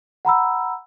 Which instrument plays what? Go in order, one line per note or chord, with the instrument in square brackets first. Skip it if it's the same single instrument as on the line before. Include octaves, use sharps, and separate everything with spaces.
[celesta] F#5 A#5 B5 E6